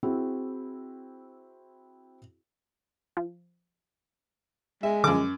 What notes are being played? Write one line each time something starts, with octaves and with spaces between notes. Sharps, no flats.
C4 E4 F#4 G#4
F3
G#3 E5
F#2 D3 F3 D6